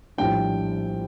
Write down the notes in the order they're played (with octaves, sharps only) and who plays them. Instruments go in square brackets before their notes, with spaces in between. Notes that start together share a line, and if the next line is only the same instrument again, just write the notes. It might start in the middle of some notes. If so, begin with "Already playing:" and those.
[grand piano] A#1 A2 G3 D4 G5